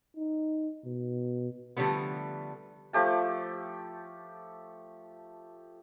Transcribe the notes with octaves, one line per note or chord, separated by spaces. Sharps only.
D#4
B2
D3 F3 G3 A3 B3
F3 A3 G4 A5